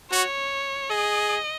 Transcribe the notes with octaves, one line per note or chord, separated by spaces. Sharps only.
F#4 C#5
G#4 D#5